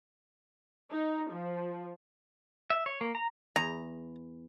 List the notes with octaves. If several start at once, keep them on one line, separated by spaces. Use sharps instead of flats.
D#4
F3
E5
C#5
A#3
A#5
E2 A#5